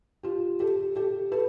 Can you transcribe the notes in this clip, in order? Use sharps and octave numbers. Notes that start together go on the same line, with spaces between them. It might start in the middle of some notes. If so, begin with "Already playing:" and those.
F4 G4
G4 A4
G4 A4
A4 B4